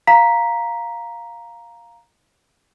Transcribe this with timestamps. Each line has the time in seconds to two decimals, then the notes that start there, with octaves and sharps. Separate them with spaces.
0.07 F5 A#5 B6